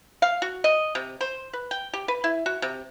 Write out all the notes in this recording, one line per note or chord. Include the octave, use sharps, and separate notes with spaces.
F5
F#4
D#5
C3
C5
B4
G5
G4
B4
E4
F#4
C3